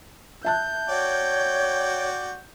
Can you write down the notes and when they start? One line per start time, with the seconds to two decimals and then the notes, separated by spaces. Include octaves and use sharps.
0.45 E5 A5 F#6 G6
0.89 F#4 C#5 D5 G5